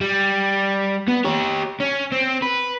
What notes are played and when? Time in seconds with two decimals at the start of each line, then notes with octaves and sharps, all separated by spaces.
0.01 G3
1.08 B3
1.25 G4 C#5
1.80 C#4
2.12 C4
2.42 B4